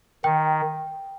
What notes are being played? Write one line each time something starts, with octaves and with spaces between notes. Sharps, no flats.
D#3 G5